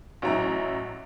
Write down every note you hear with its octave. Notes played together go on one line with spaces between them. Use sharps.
A1 F#3 E4 A#5